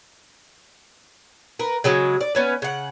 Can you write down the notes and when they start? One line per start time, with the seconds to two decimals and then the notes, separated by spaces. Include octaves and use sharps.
1.59 A#4 B4
1.84 C#3 F#3 G#3
2.21 D5
2.35 B3 C#4 B4
2.62 C#3 F#5